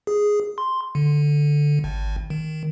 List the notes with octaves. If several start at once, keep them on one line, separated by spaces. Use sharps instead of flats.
G#4
C6
D3
G#1
D#3